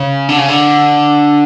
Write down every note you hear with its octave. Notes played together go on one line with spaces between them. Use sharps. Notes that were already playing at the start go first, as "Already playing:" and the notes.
Already playing: C#3
D3
C#3
D3